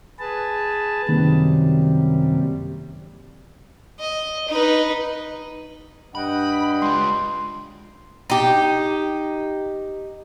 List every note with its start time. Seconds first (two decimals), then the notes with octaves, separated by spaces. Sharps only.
0.19 G#4 B4 A5
1.09 F#2 C3 D#3 G3 A#3
3.99 D#5
4.48 D#4 B4
6.15 G2 D#5 F#5 G5 B5
6.82 G#3 F4 C6
8.30 D#4 G4